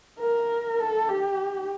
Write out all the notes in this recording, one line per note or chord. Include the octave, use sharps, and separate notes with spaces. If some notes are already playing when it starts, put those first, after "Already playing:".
A#4
A4
G4